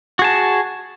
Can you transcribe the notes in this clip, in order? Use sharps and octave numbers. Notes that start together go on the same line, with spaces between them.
F#4 G#4 A5